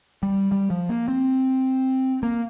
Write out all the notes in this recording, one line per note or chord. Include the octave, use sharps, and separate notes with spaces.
G3
G3
F3
A#3
C4
A#3